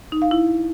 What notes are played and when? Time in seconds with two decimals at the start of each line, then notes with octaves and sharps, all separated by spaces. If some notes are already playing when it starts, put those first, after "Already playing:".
0.12 D#4
0.22 F5
0.31 E4